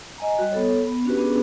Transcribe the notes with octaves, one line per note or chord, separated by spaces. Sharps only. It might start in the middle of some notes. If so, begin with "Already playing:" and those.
D#5 G#5 A#5
G3 F#4 D#5
B3 A4 C#5
B3
C#4 D4 F#4 G4 B4
B3 C#4 D4 F#4 G#4 B4